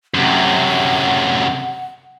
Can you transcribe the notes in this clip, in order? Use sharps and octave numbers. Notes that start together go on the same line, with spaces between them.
F#2 C3 F#5